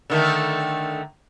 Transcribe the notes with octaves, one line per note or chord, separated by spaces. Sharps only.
D3 D#3 A3